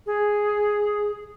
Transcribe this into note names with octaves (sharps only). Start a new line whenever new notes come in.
G#4